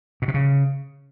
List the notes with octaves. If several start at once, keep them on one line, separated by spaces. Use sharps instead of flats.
B2
C3
C#3